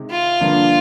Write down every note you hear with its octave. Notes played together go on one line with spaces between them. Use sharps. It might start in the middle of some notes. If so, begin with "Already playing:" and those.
Already playing: C3 D#3 G#3
F4
G2 D3 F3 A#3 D4